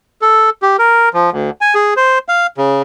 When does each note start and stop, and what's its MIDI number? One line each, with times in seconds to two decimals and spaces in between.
0.22 0.50 69
0.62 0.77 67
0.79 1.09 70
1.14 1.30 53
1.32 1.50 38
1.61 1.75 80
1.75 1.94 68
1.97 2.19 72
2.28 2.47 77
2.58 2.82 49